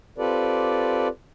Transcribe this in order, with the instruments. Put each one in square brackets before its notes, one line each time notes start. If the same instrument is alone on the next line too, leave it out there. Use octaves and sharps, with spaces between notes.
[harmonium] C4 F4 G4 A4 B4 D5